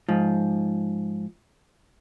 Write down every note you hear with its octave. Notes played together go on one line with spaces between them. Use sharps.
G#2 F3